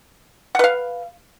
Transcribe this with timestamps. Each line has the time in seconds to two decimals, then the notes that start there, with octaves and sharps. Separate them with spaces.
0.55 F#5
0.59 B4
0.64 F5